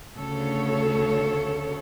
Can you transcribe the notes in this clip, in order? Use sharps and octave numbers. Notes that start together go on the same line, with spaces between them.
D2 C#3 A4 C#5